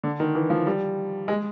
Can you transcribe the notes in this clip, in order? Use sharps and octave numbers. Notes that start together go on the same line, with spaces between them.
D3
D#3
E3
F3
G3
G#3